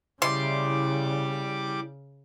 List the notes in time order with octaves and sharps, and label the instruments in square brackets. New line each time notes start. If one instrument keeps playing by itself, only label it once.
[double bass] C#3 [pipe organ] G3 G4 D6 [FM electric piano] E4 D5 [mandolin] C6